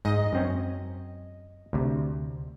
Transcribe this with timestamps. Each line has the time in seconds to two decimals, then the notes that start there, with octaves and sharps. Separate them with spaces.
0.05 G#2 D#5
0.33 F#2 C4 C#4
1.73 D2 C3